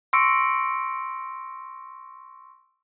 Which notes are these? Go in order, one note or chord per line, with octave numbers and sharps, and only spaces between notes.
C6 C#6 E6 A#6 C#7 D7